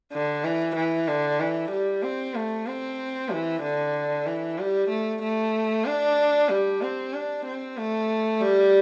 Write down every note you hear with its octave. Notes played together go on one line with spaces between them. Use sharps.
D3
E3
E3
D3
E3
G3
C4
A3
C4
E3
D3
E3
G3
A3
A3
D4
G3
C4
D4
C4
A3
G3